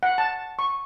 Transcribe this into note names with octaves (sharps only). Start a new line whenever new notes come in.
F#5
A5
C#6